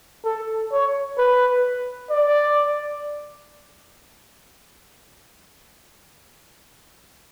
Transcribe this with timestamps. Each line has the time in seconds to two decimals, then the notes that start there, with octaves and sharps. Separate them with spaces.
0.25 A4
0.72 C#5
1.18 B4
2.10 D5